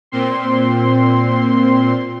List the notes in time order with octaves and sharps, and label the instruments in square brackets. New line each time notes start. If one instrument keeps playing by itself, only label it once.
[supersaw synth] A#2 C4 C6